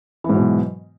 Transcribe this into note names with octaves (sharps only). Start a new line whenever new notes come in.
G#2 B2 E3 F#3